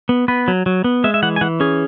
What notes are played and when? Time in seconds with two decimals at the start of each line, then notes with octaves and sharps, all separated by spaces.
0.09 B3
0.28 B3 B4
0.48 F#3
0.66 F#3
0.84 B3
1.04 G#3 E5
1.14 E5
1.23 E3 F#5
1.36 G#5
1.41 E3 F#5
1.60 C#4 G#4